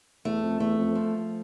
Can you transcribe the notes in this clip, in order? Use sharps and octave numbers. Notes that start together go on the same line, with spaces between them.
E2 A3
F2
E2 A3
F2
F3